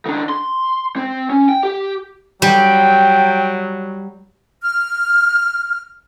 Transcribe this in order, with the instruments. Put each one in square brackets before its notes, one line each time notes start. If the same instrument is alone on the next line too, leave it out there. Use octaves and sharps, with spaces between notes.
[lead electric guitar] D#3 D4
C6
C4
C#4
G5
G4
[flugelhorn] F#3 [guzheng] G3 [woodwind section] G5
[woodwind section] F6